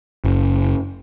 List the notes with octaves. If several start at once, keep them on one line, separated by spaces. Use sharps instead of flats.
F#1